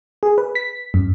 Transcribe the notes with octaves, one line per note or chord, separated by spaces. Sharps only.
G#4
B4
B6
F#2